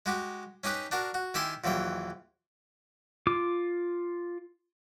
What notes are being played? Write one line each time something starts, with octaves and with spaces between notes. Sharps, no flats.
G#3 F#4 G4
C#4 D#4 G4 B4
D4 F#4 A#4
F#4
D#3 E4 G4 E5 G#5 C6
A#1 D#2 E3 F#3 G5
F4 D6